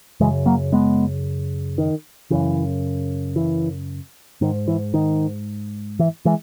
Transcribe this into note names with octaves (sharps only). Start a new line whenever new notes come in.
F#2 C#3 E3 G#3
F#3 A#3
G#3 B3
D#3
F#2 C#3 E3
E3
G#2 D#3
E3
D#3
E3
E3 G#3